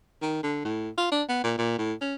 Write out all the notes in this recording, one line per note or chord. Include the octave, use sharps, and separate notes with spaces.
D#3
D3
A2
F4
D4
B3
A#2
A#2
A2
C#4